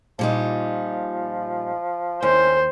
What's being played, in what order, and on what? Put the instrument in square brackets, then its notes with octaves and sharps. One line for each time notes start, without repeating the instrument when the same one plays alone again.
[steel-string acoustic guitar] A#2 G3 D#4 [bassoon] F3
[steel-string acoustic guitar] D#2 [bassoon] C#4 [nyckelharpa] C5